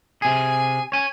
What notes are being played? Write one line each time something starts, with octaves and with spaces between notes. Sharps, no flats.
C3 G#4 G#5
C#5 G#5